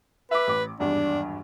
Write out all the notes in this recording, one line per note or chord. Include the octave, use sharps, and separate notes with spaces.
B4 E5 D6
A1 D6
G#1 E2 G2 D4